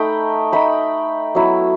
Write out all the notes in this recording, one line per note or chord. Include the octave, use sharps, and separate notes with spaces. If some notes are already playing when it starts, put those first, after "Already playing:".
Already playing: A3 D#4 G5 B5
A3 D#4 G5 B5
F#3 B3 E4